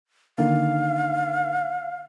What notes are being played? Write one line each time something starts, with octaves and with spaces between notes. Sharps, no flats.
D3 D#3 A#3 F5